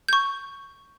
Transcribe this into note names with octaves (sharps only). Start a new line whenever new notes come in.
C#6 G6